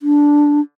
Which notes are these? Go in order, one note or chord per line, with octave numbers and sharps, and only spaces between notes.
D4